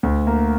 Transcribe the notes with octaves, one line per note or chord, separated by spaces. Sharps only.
D2
A#3